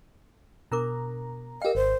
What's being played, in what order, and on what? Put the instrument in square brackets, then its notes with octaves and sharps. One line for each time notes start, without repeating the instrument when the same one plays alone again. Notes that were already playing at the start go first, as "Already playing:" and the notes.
[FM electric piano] B2 A#5 [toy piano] D4 A#4 D6
[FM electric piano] G4 F5 [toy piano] A#4 G5 [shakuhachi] D#5
[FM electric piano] G#1 [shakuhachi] C5